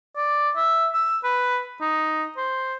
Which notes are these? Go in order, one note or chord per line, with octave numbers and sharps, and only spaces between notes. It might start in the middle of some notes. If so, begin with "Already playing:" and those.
D5
E5
E6
B4
D#4
C5